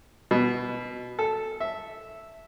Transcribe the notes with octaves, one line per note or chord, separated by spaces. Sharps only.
B2
A4
E5